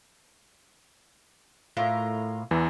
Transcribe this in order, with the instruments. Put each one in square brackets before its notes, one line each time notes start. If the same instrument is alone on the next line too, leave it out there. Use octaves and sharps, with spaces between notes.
[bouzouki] A2 F4 A#4
[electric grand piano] E2 E3